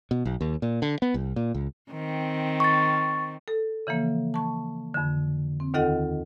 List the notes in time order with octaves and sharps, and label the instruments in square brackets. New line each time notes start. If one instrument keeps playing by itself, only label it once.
[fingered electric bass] B2
B1
D#2
A#2
D3
B3
C2
A#2
C#2
[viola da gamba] D#3 C4
[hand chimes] C#6 A6
[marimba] A4
C#3 E3 F3 A#3
A5 C#6
F2 D3
C4
D#2 D#3 F4 A4 D#5 F#5